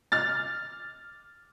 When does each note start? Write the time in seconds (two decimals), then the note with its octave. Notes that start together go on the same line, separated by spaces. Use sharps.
0.12 F6 A6